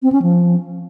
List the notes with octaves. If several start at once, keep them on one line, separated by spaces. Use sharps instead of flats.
C4
C#4
F3